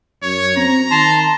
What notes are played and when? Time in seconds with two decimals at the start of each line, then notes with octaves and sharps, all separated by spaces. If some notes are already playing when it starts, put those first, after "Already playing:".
0.23 F#2 C#5
0.57 C4 A#5
0.91 D#3 A5 C6